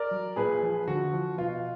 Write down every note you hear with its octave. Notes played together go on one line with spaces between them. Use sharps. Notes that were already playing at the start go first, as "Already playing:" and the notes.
Already playing: A#4 D5
F#3
A#2 G#4 B4
F3
D3 F#4
F3
B2 F4